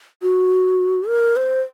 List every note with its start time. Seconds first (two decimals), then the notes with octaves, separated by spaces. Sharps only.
0.22 F#4
1.08 A#4
1.36 C5